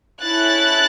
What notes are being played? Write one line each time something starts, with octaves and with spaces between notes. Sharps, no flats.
C#4 E4 A4 F#6 A6